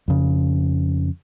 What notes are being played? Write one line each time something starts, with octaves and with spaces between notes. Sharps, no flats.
F2 C#3